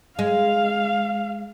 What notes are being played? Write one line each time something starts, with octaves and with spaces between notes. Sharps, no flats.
G#3 F5